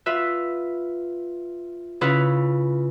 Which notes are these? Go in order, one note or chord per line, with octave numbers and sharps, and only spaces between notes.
F4 B4 E5
C#3 C#4 E4 F4 B4